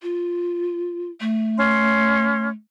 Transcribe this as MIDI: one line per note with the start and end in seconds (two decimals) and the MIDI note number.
0.02 1.10 65
1.21 2.51 57
1.57 2.47 61
1.57 2.47 84